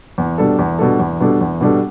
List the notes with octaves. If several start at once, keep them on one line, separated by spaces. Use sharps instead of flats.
E2
B2 G3 D4 A4
E2
B2 G3 D4 A4
E2
B2 G3 D4 A4
E2
B2 G3 D4 A4